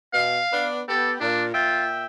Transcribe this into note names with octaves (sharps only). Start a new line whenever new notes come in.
B2 F5
B3 D4
B3 G4 A4
A#2 D4
A#2 F4 E5 G5